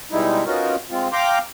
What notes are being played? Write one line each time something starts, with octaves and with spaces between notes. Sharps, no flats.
B2 G3 G#3 D#4 E4
B3 C#4 D#4 F4 F#4 A#4
G#3 C4 F4
F5 G5 A#5 C6 D6